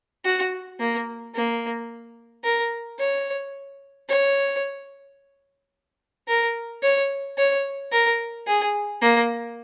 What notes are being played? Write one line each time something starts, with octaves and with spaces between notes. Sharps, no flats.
F#4
A#3
A#3
A#4
C#5
C#5
A#4
C#5
C#5
A#4
G#4
A#3